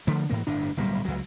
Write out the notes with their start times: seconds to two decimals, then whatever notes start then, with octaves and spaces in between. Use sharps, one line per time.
0.07 D3 F3 A3
0.30 G#2 E3 A#3
0.47 G1 A2 D4
0.77 D1 B1 A#2 G3
1.05 C#2 F#3